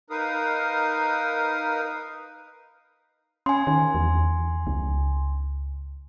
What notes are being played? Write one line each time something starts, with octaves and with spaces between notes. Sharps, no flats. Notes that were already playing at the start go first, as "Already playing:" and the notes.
D#4 A#4 B4 F5 D#6
C#4 G#5 C6
D#3
E2
C#2